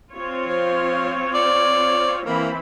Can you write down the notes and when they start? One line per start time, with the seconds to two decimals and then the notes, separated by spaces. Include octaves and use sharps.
0.13 C4 F4 C#5
0.48 F3
1.34 D5
2.26 E3 A#3 C4 B5